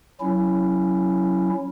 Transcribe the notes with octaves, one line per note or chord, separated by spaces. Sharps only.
F#3 C#4 E4